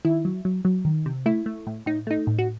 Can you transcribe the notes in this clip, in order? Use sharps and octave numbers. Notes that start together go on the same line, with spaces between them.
D#3 E4
F#3
F#3
F#3
D#3
C3
A3 E4
A3
A2
A2 D#4
A3 D#4
A2
F#4